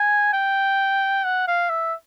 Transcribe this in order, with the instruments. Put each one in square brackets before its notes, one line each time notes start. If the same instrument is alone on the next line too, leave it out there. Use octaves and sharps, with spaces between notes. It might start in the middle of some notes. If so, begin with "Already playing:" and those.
Already playing: [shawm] G#5
G5
F#5
F5
E5